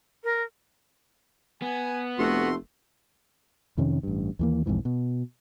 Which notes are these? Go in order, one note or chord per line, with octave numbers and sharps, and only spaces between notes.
A#4
B3 G#5
F1 A3 F#4 C6
F2 C3 D#3 C#4
A1 G2
D#2 E3 A#3
B1 F2 G#2 E3
B2